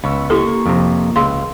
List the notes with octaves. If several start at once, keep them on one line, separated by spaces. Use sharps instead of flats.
C#2 B3 C#6 E6
A#3 E4 G4 A4 C#6
F2 C3
C#2 G#4 F5 C6